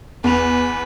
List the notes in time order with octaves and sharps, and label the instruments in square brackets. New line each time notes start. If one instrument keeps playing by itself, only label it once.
[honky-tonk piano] E2 F7 [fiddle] B4